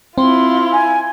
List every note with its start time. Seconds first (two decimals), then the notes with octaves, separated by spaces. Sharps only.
0.18 C4 E4 F4 C6
0.73 G#5